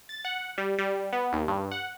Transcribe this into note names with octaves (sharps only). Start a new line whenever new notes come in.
A6
F#5
G3
G3
B3
D#2
G2
F#5